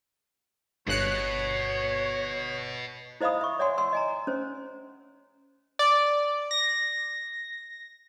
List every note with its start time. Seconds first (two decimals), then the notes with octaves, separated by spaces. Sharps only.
0.87 G1 B2 C#5 F#6 C#7
3.21 E4 C5 D#5 F5 B5 D#6
3.41 E5 C#6
3.59 C#5 D5 E5 F#5 G#5 C6
3.78 F#5 C6 E6
3.93 D#5 G#5 A#5
4.27 C#4 C5
5.79 D5
6.51 A#6